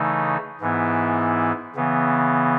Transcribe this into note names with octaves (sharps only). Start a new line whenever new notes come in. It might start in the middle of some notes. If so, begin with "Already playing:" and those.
Already playing: C#3 E3 A3 D#4
G#2 E3 B3 E4
C#3 E3 B3